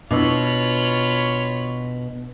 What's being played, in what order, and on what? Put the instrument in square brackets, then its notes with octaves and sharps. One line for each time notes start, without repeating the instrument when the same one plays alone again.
[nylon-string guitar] B2 [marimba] D4 E4 [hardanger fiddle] F4 B5 [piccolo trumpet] C#5